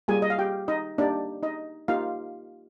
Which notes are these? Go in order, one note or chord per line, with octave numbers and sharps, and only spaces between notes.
G3 A#3 F4 G#4 G#5
D#5
F5
G4 G5
D#4 D#5
A#3 D4 D#4 G4 D5
D#4 D#5
A#3 D#4 F4 G4 F5